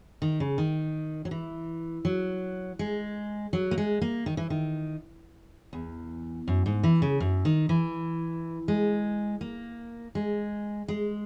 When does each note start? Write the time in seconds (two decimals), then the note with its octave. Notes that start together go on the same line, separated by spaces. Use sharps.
0.22 D#3
0.40 C#3
0.58 D#3
1.25 F#3
1.31 E3
2.05 F#3
2.79 G#3
3.53 F#3
3.71 A#3
3.78 G#3
4.01 A#3
4.26 D#3
4.37 E3
4.50 D#3
5.73 E2
6.48 F#2
6.66 G#2
6.83 E3
7.02 C#3
7.20 F#2
7.45 D#3
7.69 E3
8.68 G#3
9.41 A#3
10.15 G#3
10.88 G#3